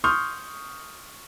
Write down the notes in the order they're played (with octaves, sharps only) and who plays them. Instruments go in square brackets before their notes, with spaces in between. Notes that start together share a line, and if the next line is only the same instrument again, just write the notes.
[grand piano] C6 C#6 D#6 F6 G6